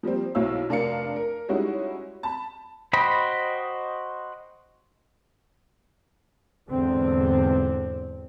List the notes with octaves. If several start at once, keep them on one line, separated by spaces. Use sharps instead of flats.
F3 G3 A#3 C4
B1 F#3 E4 C#5 F5 E6
F1 D4 A#4 F5 C#7
A#4
G3 G#3 C#4 D#4 E4 F#4
A5 B5
F#4 C5 D#5 G5 B5
E2 G#2 D3 C4